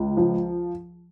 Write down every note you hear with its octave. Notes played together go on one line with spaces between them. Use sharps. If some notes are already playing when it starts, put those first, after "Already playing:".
Already playing: C#2
F3